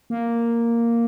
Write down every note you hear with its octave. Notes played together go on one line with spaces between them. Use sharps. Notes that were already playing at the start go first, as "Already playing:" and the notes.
A#3